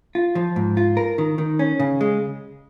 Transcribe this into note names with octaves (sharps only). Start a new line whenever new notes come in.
F4
F3
G#2
F4
A#4
D#3
D#3
C#4
C#3
G#3